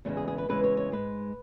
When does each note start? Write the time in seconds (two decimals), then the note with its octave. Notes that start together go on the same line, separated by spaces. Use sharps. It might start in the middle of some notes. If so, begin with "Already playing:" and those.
0.05 E2 C#3 E3 G#3 A3
0.17 G#4
0.28 G#4
0.38 B4
0.49 E2 C#3 E3 G#3 B4
0.64 C#5
0.77 C#5
0.92 G#2 G#3 B4